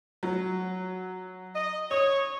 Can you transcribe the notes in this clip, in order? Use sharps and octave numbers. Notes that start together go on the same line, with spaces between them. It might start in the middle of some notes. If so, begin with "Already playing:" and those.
F#3
D#5
C#5 D#6